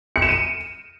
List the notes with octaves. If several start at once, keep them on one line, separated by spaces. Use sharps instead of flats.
C#7
E7
D#7